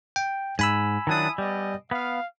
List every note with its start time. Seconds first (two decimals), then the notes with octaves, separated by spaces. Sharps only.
0.16 G5
0.59 G#2 G#5 B5 E6
1.07 D#3 F#3 D4 E4 A5 D#6
1.38 G3 B3 D5 D#5
1.91 B3 F5